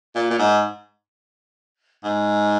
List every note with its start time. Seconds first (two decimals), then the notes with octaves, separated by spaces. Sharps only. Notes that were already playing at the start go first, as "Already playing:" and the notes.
0.15 A#2
0.30 A#2
0.39 G#2
2.04 G#2